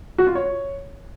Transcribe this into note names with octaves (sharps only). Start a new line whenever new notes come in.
F#4
F4
C#5